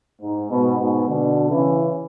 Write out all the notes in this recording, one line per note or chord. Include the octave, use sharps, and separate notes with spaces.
G#2
G#2 B2
G#2 B2
B2 D3
C#3 E3